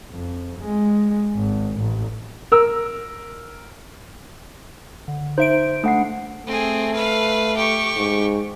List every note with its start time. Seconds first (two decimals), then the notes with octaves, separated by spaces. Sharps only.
0.11 F2
0.59 G#3
1.34 G#1
1.78 A1
2.52 A#4 E6
5.08 D3
5.38 D#4 C5 E5 D7
5.84 A3 D4 F#5 C7
6.46 A3 C4 G#4
6.94 B4 F5
7.56 G4 C#6
7.96 G#2